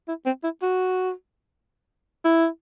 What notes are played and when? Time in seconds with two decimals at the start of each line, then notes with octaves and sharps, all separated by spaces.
0.08 E4
0.26 C4
0.44 E4
0.62 F#4
2.25 E4